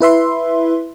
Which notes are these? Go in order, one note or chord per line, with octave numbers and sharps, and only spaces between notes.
E4 B4 E5 C6